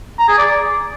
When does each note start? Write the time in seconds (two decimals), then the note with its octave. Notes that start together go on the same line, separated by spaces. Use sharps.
0.19 A#5
0.28 G#4
0.38 D5